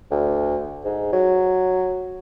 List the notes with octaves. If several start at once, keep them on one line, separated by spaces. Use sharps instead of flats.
D2
G#2
F#3